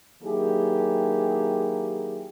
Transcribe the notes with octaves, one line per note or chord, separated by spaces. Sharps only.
D#3 F#3 A#3 E4 G4 G#4